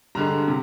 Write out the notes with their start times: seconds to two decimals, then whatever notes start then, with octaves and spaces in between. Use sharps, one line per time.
0.15 G2 D3 G#3 A#5
0.48 C3